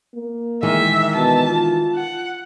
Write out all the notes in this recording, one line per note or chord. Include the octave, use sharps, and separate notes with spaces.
A#3
D#3 E3 G#3 E5
B2 A5
F4
F#5